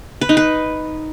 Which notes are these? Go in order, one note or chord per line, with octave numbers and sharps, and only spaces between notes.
B4
D#4
B4